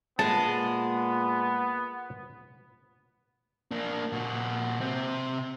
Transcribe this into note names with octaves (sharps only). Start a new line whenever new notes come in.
A#2 G#3 B3 G#4 A5
A#3 D4
A#2 F#4
C3 C4